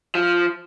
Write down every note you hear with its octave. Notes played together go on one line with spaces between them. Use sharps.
F3